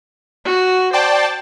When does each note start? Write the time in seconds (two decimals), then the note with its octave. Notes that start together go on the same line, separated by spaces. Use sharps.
0.45 F#4
0.93 C5 D5 G5 A5